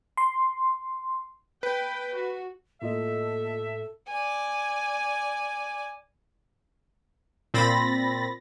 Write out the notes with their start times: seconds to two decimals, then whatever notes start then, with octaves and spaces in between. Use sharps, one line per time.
0.17 C6
1.63 B4 G5
2.16 F#4
2.82 A2 A#3 F4 A4 D#5 E5
4.08 D5 G#5
7.54 A#2 C4 B5 A6 A#6